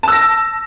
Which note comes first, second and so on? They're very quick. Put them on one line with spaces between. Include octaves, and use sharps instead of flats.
A5 E6 A#6